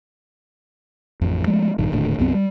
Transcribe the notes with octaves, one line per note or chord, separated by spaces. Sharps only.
A1 F2
F3 G#3 A3
A#1 G2 D#3
D#1 D#2 A2 D3
C2 F#2 B3 C4
G3